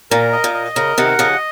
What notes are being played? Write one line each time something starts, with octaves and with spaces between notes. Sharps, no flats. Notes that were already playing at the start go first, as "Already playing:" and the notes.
A#2 A#4
D#5
A#2
D#5
C#3 A#4
C3 D#3 F#5
C#3 F3 D#5